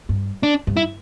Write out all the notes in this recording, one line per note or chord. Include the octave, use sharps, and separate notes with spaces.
G2
D4
G2
E4